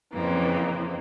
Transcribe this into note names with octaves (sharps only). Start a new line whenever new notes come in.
F2 C#3 E3 A#3